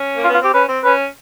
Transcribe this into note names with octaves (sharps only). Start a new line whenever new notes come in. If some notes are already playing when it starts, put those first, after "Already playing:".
Already playing: C#4
A#3
F4
B3
F4
C4 G4
C#4 B4
C4
C#4 B4